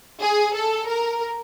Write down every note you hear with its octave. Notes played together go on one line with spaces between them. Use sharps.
G#4
A4
A#4